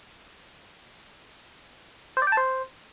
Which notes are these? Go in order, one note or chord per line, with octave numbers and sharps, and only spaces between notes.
C5
D5
G5
A5
C5